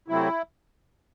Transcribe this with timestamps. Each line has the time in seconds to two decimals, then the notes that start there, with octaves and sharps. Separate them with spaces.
0.08 C3 F#3 A3 C4 E4